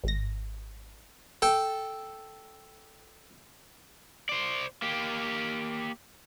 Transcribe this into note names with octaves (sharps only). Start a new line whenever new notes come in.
G#1 A#6
A4 G5
C5 D5
A#3 G4